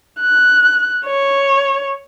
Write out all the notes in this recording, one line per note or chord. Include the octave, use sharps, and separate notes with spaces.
F#6
C#5